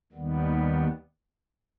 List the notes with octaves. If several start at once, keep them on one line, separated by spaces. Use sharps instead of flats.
D#2 D#3 G3 B3